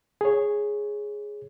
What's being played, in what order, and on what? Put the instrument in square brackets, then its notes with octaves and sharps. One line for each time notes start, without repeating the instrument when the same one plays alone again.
[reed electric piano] G#4 C#5